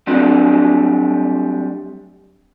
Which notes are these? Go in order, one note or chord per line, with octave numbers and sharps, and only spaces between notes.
F#3 G3 A3 C4 D4